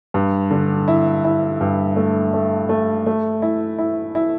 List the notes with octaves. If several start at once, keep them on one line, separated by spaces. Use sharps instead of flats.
G2
D3
E4
E4
G2
A3
A3
A3
A3
E4
E4
E4